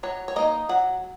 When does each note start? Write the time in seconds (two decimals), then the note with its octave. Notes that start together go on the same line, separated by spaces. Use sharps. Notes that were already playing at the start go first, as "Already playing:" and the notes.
0.03 F#3 C#5
0.28 C#5
0.36 A#3 D#4 D#5
0.69 F#3 F#5